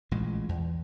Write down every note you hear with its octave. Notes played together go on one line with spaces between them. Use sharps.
A1 A#2 G#3
E2